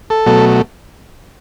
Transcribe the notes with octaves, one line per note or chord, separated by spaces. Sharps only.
A4
B2 F#3 A3